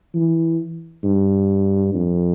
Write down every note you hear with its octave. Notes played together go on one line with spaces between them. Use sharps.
E3
G2
F2